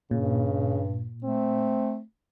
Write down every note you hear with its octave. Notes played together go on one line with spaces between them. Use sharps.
G2 A#2 C#3
A3 C4